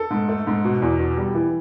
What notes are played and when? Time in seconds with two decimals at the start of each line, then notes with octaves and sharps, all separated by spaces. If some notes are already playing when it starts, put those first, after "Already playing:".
Already playing: A4
0.11 G#2
0.29 A3
0.47 G#2
0.64 B2
0.82 E2
0.99 B2
1.17 G3
1.35 E3